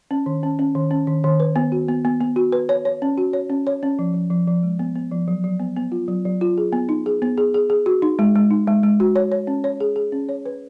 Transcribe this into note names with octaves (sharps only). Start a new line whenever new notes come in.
C#4
D#3
C#4
C#4
D#3
C#4
D#3
D#3
B4
B3
F#4
B3
B3
B3
F#4
B4
C#5
C#5
C#4
F#4
C#5
C#4
C#5
C#4
F3
F3
F3
F3
G#3
B3
B3
F3
F#3
F#3
B3
B3
F4
F#3
F#3
F4
G#4
B3
D#4
G#4
B3
G#4
G#4
G#4
F#4
D#4
G#3
G#3
D#4
G#3
G#3
F#4
C#5
C#5
C#4
C#5
G#4
G#4
C#4
C#5
B4